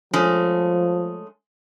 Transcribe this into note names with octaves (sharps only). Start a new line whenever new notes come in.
F3 G#3 A3 C#4